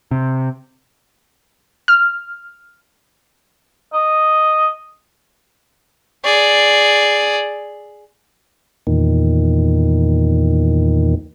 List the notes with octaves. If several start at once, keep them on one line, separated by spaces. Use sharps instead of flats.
C3
F6
D#5
G#4 D5
E2 A#2 D#3